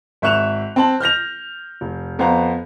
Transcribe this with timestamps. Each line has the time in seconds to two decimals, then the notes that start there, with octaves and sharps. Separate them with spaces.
0.22 G#1 E5 C#6 F#6 E7 F7
0.76 C4 A5 F#7
1.00 F6 G6 A#6 F7
1.81 F1
2.19 F2 B3 C5 F5 A#5